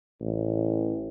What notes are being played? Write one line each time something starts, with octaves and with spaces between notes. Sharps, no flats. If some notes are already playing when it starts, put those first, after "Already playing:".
A1